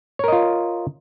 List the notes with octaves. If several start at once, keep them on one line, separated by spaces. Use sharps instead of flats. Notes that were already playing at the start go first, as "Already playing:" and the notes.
F4 A#4 C#5 D#5